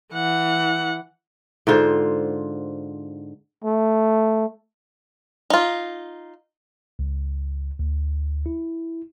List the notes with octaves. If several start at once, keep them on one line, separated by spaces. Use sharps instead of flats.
E3 F#5
G#2 D3 F4 C5
A3
D#4 F4
C#2
D2
E4